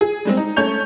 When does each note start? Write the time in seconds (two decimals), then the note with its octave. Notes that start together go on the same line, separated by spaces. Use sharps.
0.01 G#4
0.25 G3 G#3 C4
0.37 D#4
0.56 A3 C#4 C#5 G6 F7